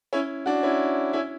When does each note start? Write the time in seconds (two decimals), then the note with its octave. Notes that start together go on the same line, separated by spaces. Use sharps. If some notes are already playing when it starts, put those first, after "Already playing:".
0.13 C#4 E4
0.46 D4 F#4
0.63 C#4 E4
1.13 C#4 E4